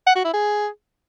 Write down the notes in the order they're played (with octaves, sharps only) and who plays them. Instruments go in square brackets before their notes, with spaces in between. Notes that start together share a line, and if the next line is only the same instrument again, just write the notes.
[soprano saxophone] F#5
F#4
E4
G#4